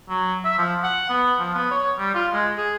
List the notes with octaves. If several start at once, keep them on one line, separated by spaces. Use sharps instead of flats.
F#3
E5
F3
F#5
B3
F3
B3
C#5
G3
F4
G#3
G#4